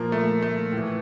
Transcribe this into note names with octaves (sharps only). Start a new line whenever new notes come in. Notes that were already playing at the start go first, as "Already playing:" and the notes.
Already playing: A#2 F3 A#3
A3
A3
A2
E3